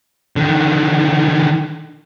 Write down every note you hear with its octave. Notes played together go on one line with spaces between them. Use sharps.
D3 D#3